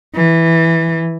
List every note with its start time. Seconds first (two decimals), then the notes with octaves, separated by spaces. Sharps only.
0.15 E3